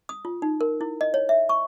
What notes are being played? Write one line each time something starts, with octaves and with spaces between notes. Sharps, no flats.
D#6
F4
D#4
A#4
E4
D#5
C#5
E5
C#6